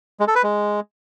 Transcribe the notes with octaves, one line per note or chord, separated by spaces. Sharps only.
G#3
A4
B4
G#3